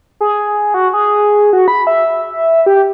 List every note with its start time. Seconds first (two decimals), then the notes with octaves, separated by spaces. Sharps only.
0.21 G#4
0.74 F#4
0.93 G#4
1.53 F#4
1.68 B5
1.87 E5
2.66 G4